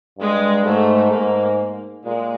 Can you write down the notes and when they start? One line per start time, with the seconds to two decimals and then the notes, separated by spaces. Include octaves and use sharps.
0.18 G2 G#3
0.65 G#2 A3
1.12 G#2 A#3
2.05 A#2 G#3